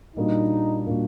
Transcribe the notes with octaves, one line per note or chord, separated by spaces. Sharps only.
A#2 G3 A#3 D4 D#4 F#4
A#2 G3 A#3 D4 F#4